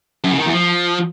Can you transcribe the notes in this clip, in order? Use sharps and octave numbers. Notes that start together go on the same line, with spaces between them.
F#2
C#3
D#3
E2
F3